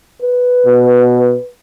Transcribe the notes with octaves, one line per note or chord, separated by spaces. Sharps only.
B4
B2